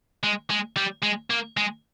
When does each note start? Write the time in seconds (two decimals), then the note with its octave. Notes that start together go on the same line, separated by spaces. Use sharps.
0.23 G#3
0.50 G#3
0.77 G3
1.03 G#3
1.30 A#3
1.57 G#3